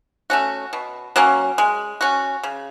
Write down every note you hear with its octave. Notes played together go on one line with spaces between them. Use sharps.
A3 C#4 F#4
B2
F#3 A#3 C#4
G#3
C#4 F#4
C#3